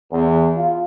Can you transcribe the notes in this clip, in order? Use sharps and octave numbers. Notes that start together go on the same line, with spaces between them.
E2
F4